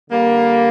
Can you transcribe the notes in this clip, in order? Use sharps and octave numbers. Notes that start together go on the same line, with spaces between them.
D3 G3 A#3